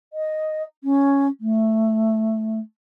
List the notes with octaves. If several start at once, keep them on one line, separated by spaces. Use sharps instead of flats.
D#5
C#4
A3